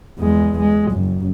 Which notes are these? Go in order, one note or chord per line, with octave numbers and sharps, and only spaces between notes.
E2 G#3
G#3
F#1 F#2